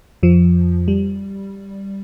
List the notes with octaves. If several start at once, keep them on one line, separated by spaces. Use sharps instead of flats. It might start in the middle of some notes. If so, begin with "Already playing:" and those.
F2 F3
G3